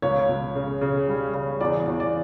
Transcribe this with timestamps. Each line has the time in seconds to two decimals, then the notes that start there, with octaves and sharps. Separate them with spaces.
0.02 C#2 C#5
0.29 C#2
0.55 C#3
0.81 C#3
1.08 G3
1.34 C#3
1.61 E2 D5
1.87 E2
2.00 D5